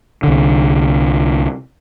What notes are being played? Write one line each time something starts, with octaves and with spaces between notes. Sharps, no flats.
C2 D3